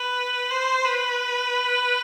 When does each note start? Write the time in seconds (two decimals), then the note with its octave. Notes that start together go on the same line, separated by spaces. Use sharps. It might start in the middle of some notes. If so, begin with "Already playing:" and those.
Already playing: B4
0.51 C5
0.85 B4